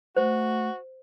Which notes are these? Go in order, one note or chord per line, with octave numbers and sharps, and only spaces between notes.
A3 F#4 C5